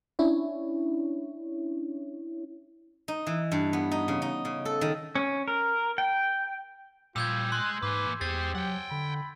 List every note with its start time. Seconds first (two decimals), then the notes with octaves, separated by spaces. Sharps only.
0.19 C#4 D4 E4 C#5
3.08 D#4
3.27 E3
3.52 G2
3.73 B3
3.91 D#4
4.08 C#3
4.22 D#4
4.45 C#3
4.65 A4
4.81 D#3
5.15 C#4
5.48 A#4
5.98 G5
7.16 A#2 F3 G3 F4 E6 G6 G#6
7.52 G#3 C6 F#6
7.82 G#2 E3 A#3 B4
8.21 E2 G4 G#4 C5 A6
8.55 F#3 F#5 G5
8.91 D3 B5